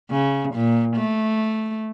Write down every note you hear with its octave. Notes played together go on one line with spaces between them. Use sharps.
C#3
A#2
A3